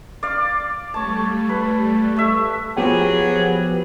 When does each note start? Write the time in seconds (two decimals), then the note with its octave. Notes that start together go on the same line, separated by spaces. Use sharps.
0.23 D5 F5
0.94 G3 A3 C#5 A5
1.49 B4
2.17 A3 E5
2.77 F3 F#3 B3 G4 G#4